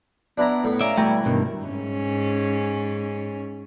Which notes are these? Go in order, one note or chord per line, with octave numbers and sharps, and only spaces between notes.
B3 D4 E4 A#5
A2
C#4 D5 E5 F5 A#5
B2 E3 G3 A3 G5 A#5
G2 B2 D#3
G#2 C#4